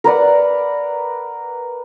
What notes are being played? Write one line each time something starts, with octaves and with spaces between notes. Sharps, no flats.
A#4 B4 D5 F#5